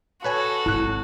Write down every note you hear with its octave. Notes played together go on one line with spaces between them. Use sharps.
F#4 A4 B4 C#5 G#5
G#1 E4 F#6